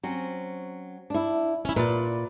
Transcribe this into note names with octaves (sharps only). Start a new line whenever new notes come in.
F#3 C4 C#4
D4 E4
C#4 E4
A#2 B4 D5